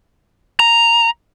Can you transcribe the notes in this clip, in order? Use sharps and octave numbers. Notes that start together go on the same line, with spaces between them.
A#5